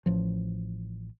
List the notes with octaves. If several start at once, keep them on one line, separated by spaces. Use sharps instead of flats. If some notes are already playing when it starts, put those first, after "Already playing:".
A1 F3